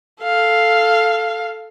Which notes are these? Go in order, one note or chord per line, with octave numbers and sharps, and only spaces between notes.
A4 F5